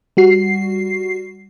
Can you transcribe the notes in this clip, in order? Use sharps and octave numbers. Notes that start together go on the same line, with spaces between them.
G3 F#4 C7